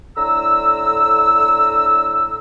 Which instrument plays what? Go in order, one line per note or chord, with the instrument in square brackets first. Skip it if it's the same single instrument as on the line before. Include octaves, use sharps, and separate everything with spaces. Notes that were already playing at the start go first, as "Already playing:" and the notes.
[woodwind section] A2 D3 A#5 E6